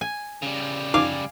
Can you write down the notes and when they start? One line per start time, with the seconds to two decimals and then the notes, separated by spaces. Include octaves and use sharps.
0.01 G#5
0.42 C#3 G3
0.94 F#2 F3 D#4 F5 G#5 D6